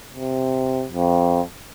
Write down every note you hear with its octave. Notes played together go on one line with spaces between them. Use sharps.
C3
F2